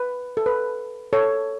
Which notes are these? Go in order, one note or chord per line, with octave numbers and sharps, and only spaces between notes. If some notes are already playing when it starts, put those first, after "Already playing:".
Already playing: B4
A4
B4
A4 C#5